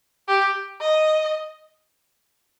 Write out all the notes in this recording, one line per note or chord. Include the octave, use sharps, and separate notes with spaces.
G4
D#5